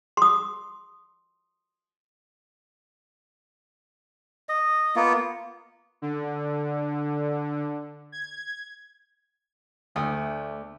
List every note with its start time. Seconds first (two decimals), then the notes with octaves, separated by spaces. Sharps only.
0.17 C6 D#6
4.49 D#5
4.96 A#3 B3 F4
6.02 D3
8.12 G#6
9.96 D2 A3 D5 D#6